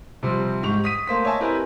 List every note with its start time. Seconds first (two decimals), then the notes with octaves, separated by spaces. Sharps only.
0.23 C3 F3 G3 C4
0.63 G#2 G4 C#6 F7
0.84 D#6 B6 D#7
1.07 A3 A#3 C5 B6
1.25 C#5 D#5 E5 G#5 A5
1.40 C4 E4 G4 A#4 B4 G#5